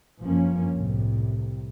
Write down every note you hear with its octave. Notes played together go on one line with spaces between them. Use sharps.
F#1 G2 F3 A#3 C#4
C2 A2 C3